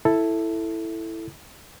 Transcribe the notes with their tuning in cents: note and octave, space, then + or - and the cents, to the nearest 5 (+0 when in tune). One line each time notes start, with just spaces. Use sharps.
E4 +0 A4 +5